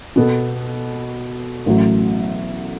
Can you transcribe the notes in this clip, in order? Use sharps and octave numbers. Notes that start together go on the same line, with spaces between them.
B2 B3 A4
A1 A2 F#3